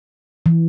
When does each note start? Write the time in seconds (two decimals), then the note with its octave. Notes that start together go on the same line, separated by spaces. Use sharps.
0.46 E3